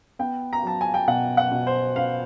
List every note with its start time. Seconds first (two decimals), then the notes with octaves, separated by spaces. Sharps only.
0.19 B3 G5
0.53 A#5
0.63 F#3 A5
0.81 G#5
0.94 G5
1.08 B2 F#5
1.37 F#5
1.52 B2
1.67 C5
1.96 B3 F5